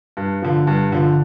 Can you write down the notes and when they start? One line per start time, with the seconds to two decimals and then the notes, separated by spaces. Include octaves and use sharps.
0.17 G2
0.42 D3 F3
0.67 G2
0.92 D3 F3